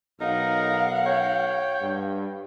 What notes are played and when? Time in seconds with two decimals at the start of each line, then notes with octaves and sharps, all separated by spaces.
0.21 B1 D#4 A#4 F5 F#5
1.06 C#5 G5
1.81 G2